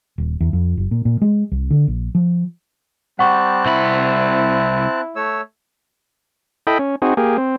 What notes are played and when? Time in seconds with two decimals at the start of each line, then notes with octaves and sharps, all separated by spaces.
0.18 D#1
0.41 E2
0.53 F2
0.77 F#1
0.91 A#2
1.05 A#2
1.22 G#3
1.52 C2
1.71 D3
1.88 A#1
2.15 F3
3.19 G3 C4 F#5 A5 C#6 F#6
3.66 C2 E4 B5
5.16 A3 C#5 E6
6.67 E4 A4 D#5 G5 B5
6.79 C#4
7.02 C4 D#4 F#4 G#4
7.17 A#3 G4 G#4
7.38 C4